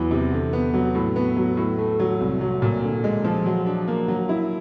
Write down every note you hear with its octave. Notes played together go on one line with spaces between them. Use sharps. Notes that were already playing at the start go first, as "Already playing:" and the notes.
Already playing: E2 E3 F#3
C3
D3
B3
F#3
A2
B3
F#3
A2
A3
F#3
C2
F#3
A#2
D3
G#3
F3
F#3
D4
A#3
F#3
E4